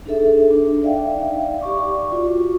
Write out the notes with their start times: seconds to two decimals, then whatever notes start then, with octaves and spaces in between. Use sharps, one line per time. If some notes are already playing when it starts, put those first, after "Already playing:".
0.06 D4 D#4 G#4 A4 E5
0.51 D4
0.82 D#4 D5 E5 F5 G5
1.61 G4 D5 C#6 D6
2.12 F4 F#4